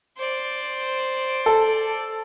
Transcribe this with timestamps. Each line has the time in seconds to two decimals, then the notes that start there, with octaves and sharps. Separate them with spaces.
0.18 C5 D5
1.46 A4